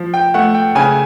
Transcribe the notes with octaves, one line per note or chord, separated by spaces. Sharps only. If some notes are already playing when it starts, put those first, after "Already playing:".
Already playing: F3
G5
A3 F#5
G5
C#3 G#5